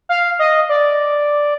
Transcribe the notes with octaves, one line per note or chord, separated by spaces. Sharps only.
F5
D#5
D5